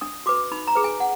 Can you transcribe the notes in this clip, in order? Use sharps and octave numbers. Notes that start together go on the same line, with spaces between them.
D4 D#6
F#4 B4 D6
D#4 B5
A#5
G#4 B4
G#5
F#5